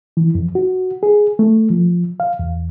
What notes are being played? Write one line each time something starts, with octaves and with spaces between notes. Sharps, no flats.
E3
F2
F#4
G#4
A3
F3
F5
E2